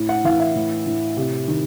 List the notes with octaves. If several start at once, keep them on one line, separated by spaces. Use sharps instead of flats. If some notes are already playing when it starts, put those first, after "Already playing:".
Already playing: A2
F#5
E3 F5
E5
A2
A2
C3
D#3